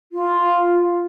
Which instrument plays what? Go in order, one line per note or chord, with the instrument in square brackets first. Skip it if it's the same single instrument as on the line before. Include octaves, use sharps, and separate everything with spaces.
[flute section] F4